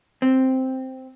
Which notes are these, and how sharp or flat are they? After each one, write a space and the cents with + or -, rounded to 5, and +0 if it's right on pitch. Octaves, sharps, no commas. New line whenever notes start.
C4 +0